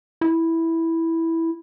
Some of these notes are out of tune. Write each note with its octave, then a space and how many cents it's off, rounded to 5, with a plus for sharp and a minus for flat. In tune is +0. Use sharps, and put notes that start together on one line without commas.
E4 -5